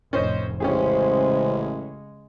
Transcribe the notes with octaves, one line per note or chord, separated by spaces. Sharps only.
F1 A2 C#4 C5 D#5
A1 C#3 G#3 C#4 G4 G#4 C5